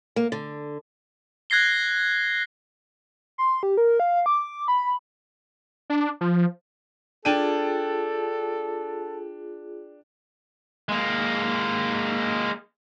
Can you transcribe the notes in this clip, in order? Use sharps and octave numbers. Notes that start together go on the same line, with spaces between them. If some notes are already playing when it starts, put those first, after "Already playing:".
A#3
D3
F#6 G#6 A#6 C7 G7
C6
G4
A#4
F5
D6
B5
D4
F3
D4 F4 G#4 A4 G5 D#7
G#3 A#3